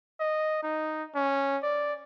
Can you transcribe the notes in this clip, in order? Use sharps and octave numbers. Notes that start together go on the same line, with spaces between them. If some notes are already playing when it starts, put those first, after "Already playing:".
D#5
D#4
C#4
D5